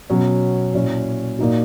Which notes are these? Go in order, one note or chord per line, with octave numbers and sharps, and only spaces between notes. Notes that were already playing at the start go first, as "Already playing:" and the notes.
B2 F#3 C#4
A#2 F#3 C#4 E4
A#2 A#3 D#4 F#4